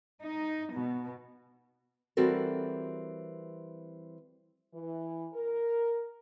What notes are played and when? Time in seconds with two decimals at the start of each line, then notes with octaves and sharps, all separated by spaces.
0.22 D#4
0.73 B2
2.17 E3 G3 C4 F#4 A4 A#4
4.74 E3
5.33 A#4